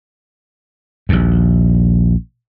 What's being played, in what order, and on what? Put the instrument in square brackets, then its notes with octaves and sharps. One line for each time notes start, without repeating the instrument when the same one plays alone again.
[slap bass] A#1 D#2